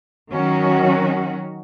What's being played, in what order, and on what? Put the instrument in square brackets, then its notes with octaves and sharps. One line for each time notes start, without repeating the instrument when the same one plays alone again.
[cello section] D#3 F#3 C#4 F#4